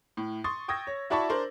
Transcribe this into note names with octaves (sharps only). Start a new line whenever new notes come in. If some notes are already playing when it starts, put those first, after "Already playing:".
A2
C6 C#6 D#6 A6
G5 C#6 D#6 E6 G#6 A#6
C#5
E4 F#4 D5 A5 B5 C#6
D4 A#4 C5 D5